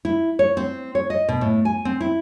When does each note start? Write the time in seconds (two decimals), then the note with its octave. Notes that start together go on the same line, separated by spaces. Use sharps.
0.05 E4
0.39 C#5
0.57 C4
0.95 C#5
1.10 D#5
1.29 B2
1.41 A2
1.65 G#5
1.85 C4
2.01 E4